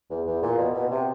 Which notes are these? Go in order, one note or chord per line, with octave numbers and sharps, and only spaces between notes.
E2
E2
A#2
B2
B2
C3